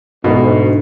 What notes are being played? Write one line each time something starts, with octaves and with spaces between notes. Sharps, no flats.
D2 G#2 B2